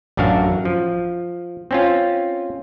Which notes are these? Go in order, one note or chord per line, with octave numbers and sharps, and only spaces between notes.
A1 F#2 D4 F#4 F5
F3
C4 C#4 F4